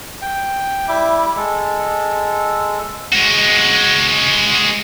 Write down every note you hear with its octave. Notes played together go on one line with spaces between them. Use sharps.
G5
G3 E4 E5 D6
G#3 A4
G#3 F#4